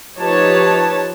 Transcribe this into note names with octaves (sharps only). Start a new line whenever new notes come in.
F3 D#4 G4 B4 C#5 A5